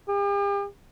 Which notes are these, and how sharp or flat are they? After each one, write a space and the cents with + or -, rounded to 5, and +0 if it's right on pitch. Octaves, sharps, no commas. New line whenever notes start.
G4 +45